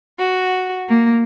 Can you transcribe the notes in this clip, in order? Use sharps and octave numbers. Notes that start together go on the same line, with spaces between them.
F#4
A#3